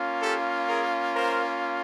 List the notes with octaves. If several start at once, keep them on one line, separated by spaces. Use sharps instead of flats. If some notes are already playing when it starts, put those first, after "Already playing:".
Already playing: A#3 C#4 F4
G4 A4
G#4 A#4
A#4 C5